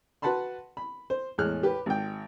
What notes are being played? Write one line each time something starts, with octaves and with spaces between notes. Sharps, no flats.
F#4 B4 F#5 A5 B5 C6
B5
C5
E2 A2 G#3 F6 F#6
G4 B4
G#1 G5